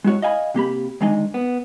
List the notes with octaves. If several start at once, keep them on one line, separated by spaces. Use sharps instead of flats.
G#3 E4 F#4 C#5
D#5 F5 G#5 B5
C3 A#3 G4 B5
D2 D#3 G#3 D4 D#4 G#5
B3